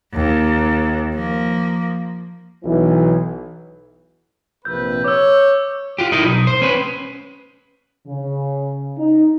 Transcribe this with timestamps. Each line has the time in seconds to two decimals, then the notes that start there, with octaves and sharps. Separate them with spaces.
0.13 D#2
1.15 F3 A#3
2.64 B1 E3
4.65 A#1 C3 B4 E6 G6
5.04 C#5 D6 E6
5.98 F4 G4
6.12 D#4 E4 A#4 D#5
6.25 B1
6.47 C5
6.62 C#4 B4
8.06 C#3
8.97 D#4